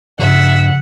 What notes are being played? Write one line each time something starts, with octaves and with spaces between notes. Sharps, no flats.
G2 C#3 F3 E5 F#5